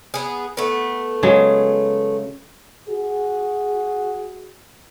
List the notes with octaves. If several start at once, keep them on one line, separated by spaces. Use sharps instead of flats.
B3 G#4
A3 B3
C#3 F#3 G#3
F#4 G#4